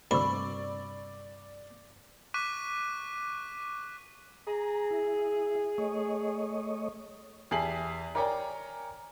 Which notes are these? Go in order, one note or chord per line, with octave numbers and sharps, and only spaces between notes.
D2 G2 C3 D5 B5 C#6 E6
C#6 D6 F#6 B6 D#7
G#4 A#5
E4
A3 C#5 D#5
E2 G4 G#5 A5 C7 F#7
A#4 C#5 D5 G5 G#5 A#5